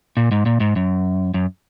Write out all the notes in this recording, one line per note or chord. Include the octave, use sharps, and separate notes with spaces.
A#2
G#2
A#2
G#2
F#2
F#2